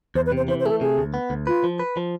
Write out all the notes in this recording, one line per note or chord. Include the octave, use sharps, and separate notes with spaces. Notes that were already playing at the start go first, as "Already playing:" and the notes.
E2 C5
B4
C3 C5
E3 C5
C5
A3 G#4
A4
C3 G#4
D2
B3
D2
F4 B4
F3
B4
F3